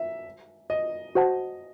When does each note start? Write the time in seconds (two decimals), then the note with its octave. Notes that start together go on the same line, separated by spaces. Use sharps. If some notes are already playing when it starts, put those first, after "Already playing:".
Already playing: E5
0.70 D#5
1.15 F#4 C5 F#5 A5